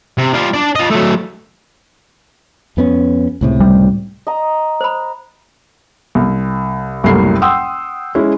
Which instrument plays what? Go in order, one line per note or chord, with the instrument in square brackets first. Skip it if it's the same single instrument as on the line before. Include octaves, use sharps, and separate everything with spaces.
[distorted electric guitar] C3
G3 F4
D4 D5
F4 D#5
F#3 A3
[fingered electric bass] F2 B3 C#4
C#2 A2 C3
[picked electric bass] G3
[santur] D#5 A#5
[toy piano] C5 B5
[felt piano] C2
F#1 C2 A2 G3 A#3 C7
F#5 G5 C6 D#6 E6
G#3 C#4 E4